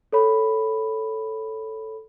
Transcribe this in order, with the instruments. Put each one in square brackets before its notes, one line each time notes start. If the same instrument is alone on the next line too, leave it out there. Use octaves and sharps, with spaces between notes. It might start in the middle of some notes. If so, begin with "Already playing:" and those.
[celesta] A4 C#5 B5